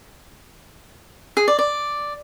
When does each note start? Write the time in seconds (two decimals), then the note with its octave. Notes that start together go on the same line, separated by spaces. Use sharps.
1.37 G#4
1.48 D5
1.59 D5